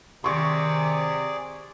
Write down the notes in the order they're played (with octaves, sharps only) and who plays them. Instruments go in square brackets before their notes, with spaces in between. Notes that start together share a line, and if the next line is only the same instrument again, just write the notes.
[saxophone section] C3 [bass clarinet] D#3 [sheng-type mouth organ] G#4 D5 [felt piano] C6 C#6